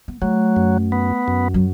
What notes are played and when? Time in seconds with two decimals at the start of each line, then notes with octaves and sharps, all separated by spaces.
0.08 B3
0.22 F#3 A3
0.56 F#2
0.92 B3
1.28 F#2
1.54 F#3